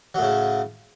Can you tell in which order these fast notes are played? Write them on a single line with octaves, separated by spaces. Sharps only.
F#3 A2 C#3